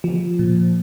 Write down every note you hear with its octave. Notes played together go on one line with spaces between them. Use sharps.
F3
A#2